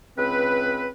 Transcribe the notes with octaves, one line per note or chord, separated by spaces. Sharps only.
C#2 C4 B4